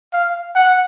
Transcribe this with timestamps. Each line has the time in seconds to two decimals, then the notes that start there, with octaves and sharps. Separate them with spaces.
0.13 F5
0.55 F#5